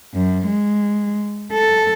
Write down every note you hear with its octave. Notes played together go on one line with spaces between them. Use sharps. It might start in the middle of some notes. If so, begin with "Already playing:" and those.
F#2
G#3
A4